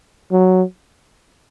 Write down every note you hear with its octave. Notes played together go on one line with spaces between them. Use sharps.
F#3